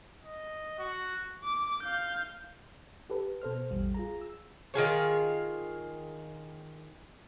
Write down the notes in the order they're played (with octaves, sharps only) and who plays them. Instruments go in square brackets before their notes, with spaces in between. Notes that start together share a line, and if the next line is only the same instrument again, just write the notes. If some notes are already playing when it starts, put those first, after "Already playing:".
[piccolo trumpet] D#5
F#4
[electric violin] D6
F5 G6
[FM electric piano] G4 A4 B4
B2 A4 C5 F6
A1 E2 G3
F4 G#4 A#5
E6
[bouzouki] D#3 F4 G#4 C#5